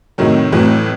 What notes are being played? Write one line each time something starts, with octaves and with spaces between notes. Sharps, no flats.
A2 C3 D#3 F#3
F2 A2 E3 F#3